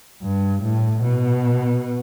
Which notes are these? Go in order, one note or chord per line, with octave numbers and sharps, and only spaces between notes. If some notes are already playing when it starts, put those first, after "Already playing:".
G2
A2
B2